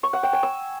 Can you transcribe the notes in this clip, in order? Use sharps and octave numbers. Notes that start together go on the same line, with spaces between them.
C#6
F#5
G5
G#5
E6